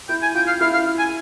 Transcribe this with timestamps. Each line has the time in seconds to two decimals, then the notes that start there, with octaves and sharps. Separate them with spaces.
0.09 E4 G5
0.22 G#5
0.35 F4 G5
0.47 F5
0.61 E4 F5
0.74 F5
0.99 G#5